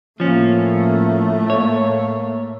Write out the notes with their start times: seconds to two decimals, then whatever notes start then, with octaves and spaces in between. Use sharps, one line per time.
0.20 A2 F3 A3 A#3 C#4
1.50 A#3 C#5